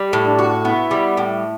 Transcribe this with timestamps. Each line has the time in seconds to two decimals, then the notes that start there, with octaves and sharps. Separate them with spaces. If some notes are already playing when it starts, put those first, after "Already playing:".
Already playing: G3
0.13 A2
0.26 D4
0.39 F#4
0.65 B3 E4
0.91 G3
1.17 A2